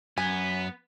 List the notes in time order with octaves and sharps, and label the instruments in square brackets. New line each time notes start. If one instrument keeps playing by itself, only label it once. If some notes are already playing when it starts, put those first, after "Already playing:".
[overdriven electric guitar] F#2 [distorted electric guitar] B3 [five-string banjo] G#5